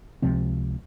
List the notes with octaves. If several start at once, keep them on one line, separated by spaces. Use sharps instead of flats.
C#2 C3 F3 C4